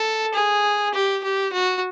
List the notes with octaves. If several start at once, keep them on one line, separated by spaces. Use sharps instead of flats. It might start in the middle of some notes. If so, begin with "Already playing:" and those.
Already playing: A4
G#4
G4
G4
F#4